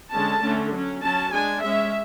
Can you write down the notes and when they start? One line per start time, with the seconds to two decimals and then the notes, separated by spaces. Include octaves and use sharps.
0.13 D3 G#3 C#4 A5
0.42 D3 A3 C#4
0.72 F#3 C#4
1.02 F#3 C#4 A5
1.32 G#3 D4 G#5
1.62 G#3 C#4 E5